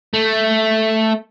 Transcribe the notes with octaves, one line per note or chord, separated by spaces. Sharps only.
A3